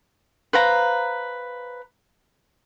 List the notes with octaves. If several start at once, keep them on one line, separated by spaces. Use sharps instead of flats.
B4 C5 F5 A#5